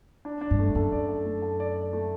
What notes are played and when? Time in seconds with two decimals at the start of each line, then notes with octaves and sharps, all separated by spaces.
0.25 D4
0.41 D4
0.51 G2
0.59 A3
0.75 F#2 A4
0.92 D5
1.09 A4
1.26 A3
1.42 A4
1.60 D5
1.76 D5
1.93 A3